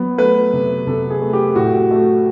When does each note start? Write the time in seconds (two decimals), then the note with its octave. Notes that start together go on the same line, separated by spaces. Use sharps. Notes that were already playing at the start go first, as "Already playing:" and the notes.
Already playing: F#3 B3
0.18 A3 B4
0.53 C3
0.87 C3 A4
1.10 G#4
1.21 A3
1.33 G4
1.55 A2 F#4
1.91 A3